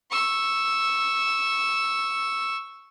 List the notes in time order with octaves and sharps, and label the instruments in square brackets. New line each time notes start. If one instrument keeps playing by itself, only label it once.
[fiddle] C#6 E6